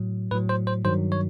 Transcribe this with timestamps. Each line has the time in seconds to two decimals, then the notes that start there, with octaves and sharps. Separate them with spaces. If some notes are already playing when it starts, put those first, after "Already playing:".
Already playing: A2 F#3
0.31 A2 F#3 B4
0.49 C5
0.67 C5
0.85 G2 D#3 F#3 C5
1.12 C#5